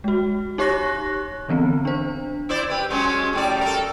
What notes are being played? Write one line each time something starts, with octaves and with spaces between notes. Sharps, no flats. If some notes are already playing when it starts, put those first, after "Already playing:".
G#3 F#4
D#4 G4 C#5 C#6 F#6 A#6
D3 E3 B3 C4
D4 C5
E4 C5 D5
G4 B4
F#3 G#3 C#4
A2 G3 D5
A4 A#4